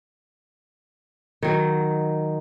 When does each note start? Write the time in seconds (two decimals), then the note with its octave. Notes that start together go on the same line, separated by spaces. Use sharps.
1.43 D#3 F#3